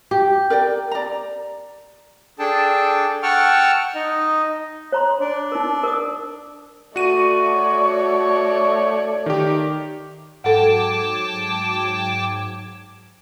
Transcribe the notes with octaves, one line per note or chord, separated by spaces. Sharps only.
G4
A#4 D5 G5
D5 A#5
D4 G#4 A4 G5 A5
F#5 G5 A5 C#6 E6 F6
D#4 D#5
C#5 A#5 C6
D4
D#4 A#4
A#4 D#6
A3 F#4 D5 C#6 D#7
C#5
D#3 G4
G#2 F#3 A4 F#5 G5 A5 D6 G#6